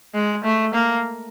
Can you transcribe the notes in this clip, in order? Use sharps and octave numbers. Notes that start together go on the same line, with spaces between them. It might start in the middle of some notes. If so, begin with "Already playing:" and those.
G#3
A3
A#3